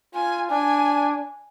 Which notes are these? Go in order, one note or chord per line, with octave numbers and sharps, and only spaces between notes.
F4 G#5
D4 G#5